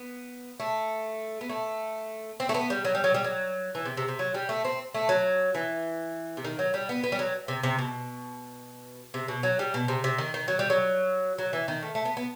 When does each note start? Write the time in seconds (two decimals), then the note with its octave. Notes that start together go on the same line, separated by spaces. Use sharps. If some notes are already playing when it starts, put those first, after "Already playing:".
Already playing: B3
0.60 A3
1.41 B3
1.49 A3
2.40 C4
2.49 A3
2.54 B3
2.70 G3
2.85 F#3
2.95 G3
3.04 F#3
3.14 G3
3.24 F#3
3.75 E3
3.85 C3
3.97 C3
4.08 C3
4.19 F#3
4.34 G3
4.49 A3
4.65 C4
4.94 A3
5.09 F#3
5.55 E3
6.37 C3
6.44 D#3
6.59 F#3
6.74 G3
6.89 B3
7.04 B3
7.12 G3
7.19 F#3
7.48 C3
7.63 C3
7.79 B2
9.14 C3
9.28 B2
9.43 F#3
9.59 G3
9.74 B2
9.88 C3
10.04 C3
10.18 D#3
10.34 D#3
10.48 F#3
10.59 G3
10.70 F#3
11.38 F#3
11.53 E3
11.68 D#3
11.83 A3
11.95 A3
12.05 B3
12.17 B3